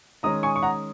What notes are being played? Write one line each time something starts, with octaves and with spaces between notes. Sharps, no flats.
D#3 G#3 C#4 A#5 D#6
G#5 C#6
C#6
F#5 A#5